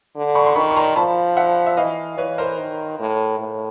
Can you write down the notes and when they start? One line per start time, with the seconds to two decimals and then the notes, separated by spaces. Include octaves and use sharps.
0.16 D3
0.35 B5 C#6
0.46 C6
0.55 D#3 B5 C#6
0.71 C#6
0.76 A#5 C6
0.96 F3 A5 B5
1.37 E5 F#5
1.66 E5
1.77 E3 D#5 F5
2.18 E3 B4 C#5
2.38 A#4 C5
2.58 D#3
3.00 A2
3.40 A2